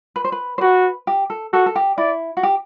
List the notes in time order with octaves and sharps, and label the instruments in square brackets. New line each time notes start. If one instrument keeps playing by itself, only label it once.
[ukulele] B4
C5
B4
C5
[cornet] F#4 [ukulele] B4
[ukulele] G4
A4
[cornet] F#4 [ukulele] A4
[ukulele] A4
G4
[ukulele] E4 [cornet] D5
[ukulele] F#4
G4